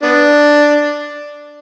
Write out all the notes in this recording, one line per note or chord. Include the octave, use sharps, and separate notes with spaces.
B3 D4